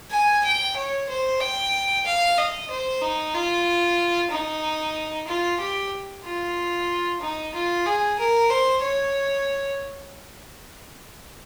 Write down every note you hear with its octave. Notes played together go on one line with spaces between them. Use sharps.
G#5
G5
C#5
C5
G5
F5
D#5
C5
D#4
F4
D#4
F4
G4
F4
D#4
F4
G#4
A#4
C5
C#5